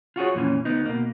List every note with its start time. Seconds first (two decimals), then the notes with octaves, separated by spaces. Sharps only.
0.16 F4 F#4 G#4 C#5
0.35 F2 A#2 E3 C#4
0.65 D2 B3 D#4
0.85 B2 A#3